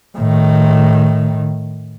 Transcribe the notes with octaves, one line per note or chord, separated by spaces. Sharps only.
A2 D#3